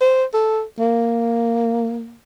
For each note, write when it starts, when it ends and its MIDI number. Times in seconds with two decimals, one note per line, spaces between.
0.01 0.24 72
0.34 0.63 69
0.79 2.16 58